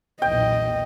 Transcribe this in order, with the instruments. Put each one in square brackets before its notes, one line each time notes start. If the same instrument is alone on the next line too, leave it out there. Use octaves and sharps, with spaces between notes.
[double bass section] B1 E2 A#2 [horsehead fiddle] D#5 [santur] G5